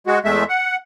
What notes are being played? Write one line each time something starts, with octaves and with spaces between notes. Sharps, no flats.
G#3 F#4
E2 G#3 A3 E5
F#5